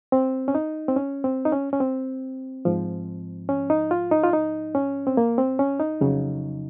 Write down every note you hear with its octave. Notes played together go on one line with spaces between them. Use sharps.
C4
C#4
D#4
C4
C#4
C4
D#4
C#4
C#4
C4
G#2 F3
C#4
D#4
F4
D#4
F4
D#4
C#4
C4
A#3
C4
C#4
D#4
F2 C#3 F#3